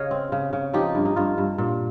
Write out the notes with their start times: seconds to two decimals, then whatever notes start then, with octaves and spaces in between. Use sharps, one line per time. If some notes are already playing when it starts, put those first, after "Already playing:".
Already playing: C#3 C#5 D#5 F5
0.11 C4
0.32 C#3
0.53 C#3
0.73 F3 D#4 G4
0.95 G2
1.05 D#4
1.16 G2 F4
1.38 G2
1.58 A#2